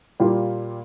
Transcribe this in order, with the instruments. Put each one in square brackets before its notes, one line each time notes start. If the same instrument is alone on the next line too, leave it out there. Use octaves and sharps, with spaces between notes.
[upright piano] A#2 G3 A#3 F4